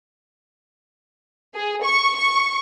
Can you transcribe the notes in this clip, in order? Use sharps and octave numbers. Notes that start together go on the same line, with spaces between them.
G#4
C#6
C#6